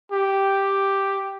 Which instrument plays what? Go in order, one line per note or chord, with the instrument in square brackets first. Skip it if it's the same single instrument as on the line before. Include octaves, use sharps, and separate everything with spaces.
[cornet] G4